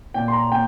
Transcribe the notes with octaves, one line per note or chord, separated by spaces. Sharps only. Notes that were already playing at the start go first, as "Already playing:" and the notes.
A#2 G5
C6
A#5
A#2 G5